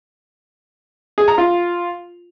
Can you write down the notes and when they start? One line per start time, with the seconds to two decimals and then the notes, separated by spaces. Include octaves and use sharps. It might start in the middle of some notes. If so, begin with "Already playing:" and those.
1.18 G#4
1.28 A#5
1.38 F4